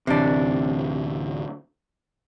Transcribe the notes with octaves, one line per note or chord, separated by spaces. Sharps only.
D1 D2 C3 E3 D4